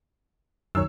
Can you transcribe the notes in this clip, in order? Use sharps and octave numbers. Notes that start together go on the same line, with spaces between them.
C#2 F#2 D#3 F#3 C#5 E6